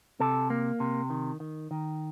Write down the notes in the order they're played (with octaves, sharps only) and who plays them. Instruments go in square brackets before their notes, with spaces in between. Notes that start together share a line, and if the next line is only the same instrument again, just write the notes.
[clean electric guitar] C3 A4
A#3
C3
D#3
D#3
D#3